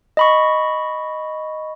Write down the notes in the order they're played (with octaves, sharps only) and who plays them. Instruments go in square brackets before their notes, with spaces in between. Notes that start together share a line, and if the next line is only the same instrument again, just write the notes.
[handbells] D#5 B5 C#6